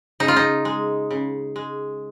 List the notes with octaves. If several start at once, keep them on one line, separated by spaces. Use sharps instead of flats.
C#3 D#4
F4
D#4
G#3
C#3
G#3